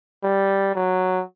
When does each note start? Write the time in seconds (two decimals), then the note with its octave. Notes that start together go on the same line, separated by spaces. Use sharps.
0.23 G3
0.75 F#3